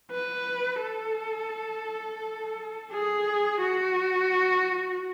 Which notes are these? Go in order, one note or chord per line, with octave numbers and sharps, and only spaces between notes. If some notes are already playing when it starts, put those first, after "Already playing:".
B4
A4
G#4
F#4